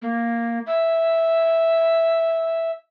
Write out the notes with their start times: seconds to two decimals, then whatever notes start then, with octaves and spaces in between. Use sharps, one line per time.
0.02 A#3
0.67 E5